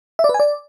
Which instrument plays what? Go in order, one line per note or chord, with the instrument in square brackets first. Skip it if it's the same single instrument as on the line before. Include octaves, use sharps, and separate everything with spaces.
[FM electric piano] E5
D5
B4
G#5
D5